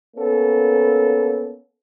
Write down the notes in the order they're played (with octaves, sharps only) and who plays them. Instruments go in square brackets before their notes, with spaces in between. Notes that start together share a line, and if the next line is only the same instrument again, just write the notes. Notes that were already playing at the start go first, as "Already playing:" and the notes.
[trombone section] A#3 B3 C#4 A4